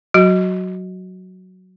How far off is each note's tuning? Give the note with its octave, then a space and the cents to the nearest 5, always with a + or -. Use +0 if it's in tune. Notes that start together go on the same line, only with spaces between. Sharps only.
F#3 +0 F#4 +0